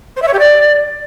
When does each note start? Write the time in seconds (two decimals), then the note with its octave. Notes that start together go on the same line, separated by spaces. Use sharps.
0.16 C5
0.22 E5
0.27 C#5
0.33 G4
0.39 D5